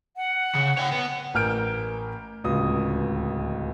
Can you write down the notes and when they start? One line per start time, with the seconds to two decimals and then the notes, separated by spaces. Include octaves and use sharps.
0.15 F#5
0.55 C#3
0.77 C#5 G5
0.92 B3
1.34 A1 A#4 G#5 F6 G6 D7
2.44 D1 C#2 D#6